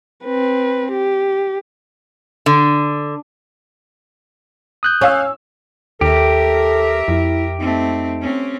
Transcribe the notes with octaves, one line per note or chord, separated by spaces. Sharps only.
C4 B4
G4
D3
D#6 F#6 G6
C#4 C#5 F5 E6
D#2 G4 A4 A#4 E5
F2 E4
A3 C4 D#4
C4 C#4